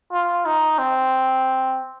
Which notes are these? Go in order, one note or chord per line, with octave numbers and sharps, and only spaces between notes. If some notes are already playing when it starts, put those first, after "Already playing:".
F4
D#4
C4